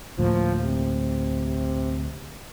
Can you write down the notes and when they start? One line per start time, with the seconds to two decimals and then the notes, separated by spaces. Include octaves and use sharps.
0.18 D2 A2 F3 A#3
0.63 C3